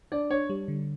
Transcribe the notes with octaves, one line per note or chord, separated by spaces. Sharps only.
D4 D5
D4 C#5
G3
D3